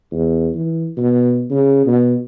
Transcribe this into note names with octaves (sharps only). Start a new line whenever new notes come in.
E2
E3
B2
C#3
B2